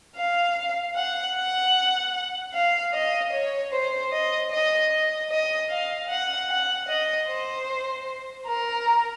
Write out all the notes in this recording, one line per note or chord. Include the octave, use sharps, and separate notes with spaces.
F5
F#5
F#5
F5
D#5
C#5
C5
D#5
D#5
D#5
D#5
F5
F#5
F#5
D#5
C5
A#4